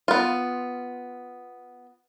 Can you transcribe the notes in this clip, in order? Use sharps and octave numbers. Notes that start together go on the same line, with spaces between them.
B3 F4